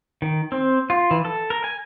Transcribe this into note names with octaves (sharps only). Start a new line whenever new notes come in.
D#3
C4
F4
E3
A4
A#4
G#5